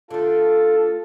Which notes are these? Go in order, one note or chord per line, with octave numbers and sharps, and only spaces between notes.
D3 A3 F4 A4